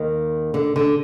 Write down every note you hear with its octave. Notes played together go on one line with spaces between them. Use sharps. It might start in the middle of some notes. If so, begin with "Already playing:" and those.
Already playing: D#2 D#3
D3
D3